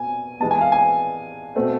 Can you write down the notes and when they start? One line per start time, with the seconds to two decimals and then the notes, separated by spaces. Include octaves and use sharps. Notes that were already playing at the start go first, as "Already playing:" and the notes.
Already playing: B2 G#5
0.40 E3 G#3 B3 A5
0.51 G#5
0.61 F5
0.72 G#5
1.55 B2 A3 C4